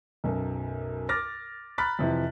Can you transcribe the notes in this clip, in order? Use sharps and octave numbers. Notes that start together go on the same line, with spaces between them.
B1 F#2
D6 F6 A6 A#6
A#5 B5 F6 F#6 A6 B6
F2 C3 E3